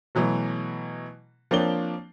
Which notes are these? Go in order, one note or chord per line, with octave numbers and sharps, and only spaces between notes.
B2 E3 F#3 A3
F3 A#3 C4 D4 C#5 G7